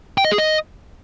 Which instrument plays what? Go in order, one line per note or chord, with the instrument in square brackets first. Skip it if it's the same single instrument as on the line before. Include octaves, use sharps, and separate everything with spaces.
[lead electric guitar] G5
D#5
G#4
D#5